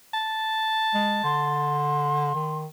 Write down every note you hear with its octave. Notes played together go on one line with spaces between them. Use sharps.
A5
G#3
D3 C6
D#3